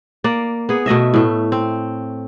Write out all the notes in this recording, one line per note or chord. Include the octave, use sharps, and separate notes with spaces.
A#3 D5
B3 G#4
B2 A3 D#5 E5
A2 A3
C4